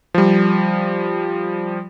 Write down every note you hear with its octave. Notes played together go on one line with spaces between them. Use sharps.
F3 G3